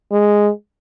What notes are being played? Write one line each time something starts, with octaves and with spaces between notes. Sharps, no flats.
G#3